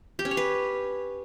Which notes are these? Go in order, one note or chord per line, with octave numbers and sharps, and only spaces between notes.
G4
C#4
C#5
B4